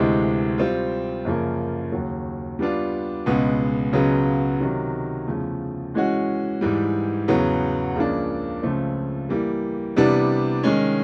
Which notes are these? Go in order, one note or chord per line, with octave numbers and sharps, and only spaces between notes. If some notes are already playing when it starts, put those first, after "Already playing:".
Already playing: D2 C3 E3 G#3 C4
G3 C4 F4
F#2 C#3 F3 A#3
D#2 C#3 F#3
G3 B3 D4 F4
C#2 B2 G#3 B3
C#2 C#3 F#3 B3
C3 D#3 F#3
E2 C#3 F3 A3
E3 G#3 C#4 F#4
G#2 E3 G3
E2 C#3 F#3 B3
C#2 C#3 F3 A#3 D4
C#2 C#3 F3 A3 C4
E3 G3 A#3
C3 E3 G3 B3 D4
D#3 G#3 C#4